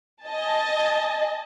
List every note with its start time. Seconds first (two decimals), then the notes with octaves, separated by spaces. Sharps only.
0.25 D#5 G#5 A5